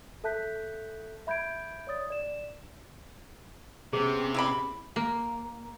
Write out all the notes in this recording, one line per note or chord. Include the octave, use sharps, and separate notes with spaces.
A4 E5 A5 F#6 G6 B6
E5 B5 G6 G#6 D7
C#5 D5 D#6 A6
D5 E7
C3 B3 C#4 G#4
E4 D5 B5
A#3